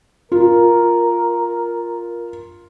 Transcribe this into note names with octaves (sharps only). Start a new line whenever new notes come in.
F4 A#4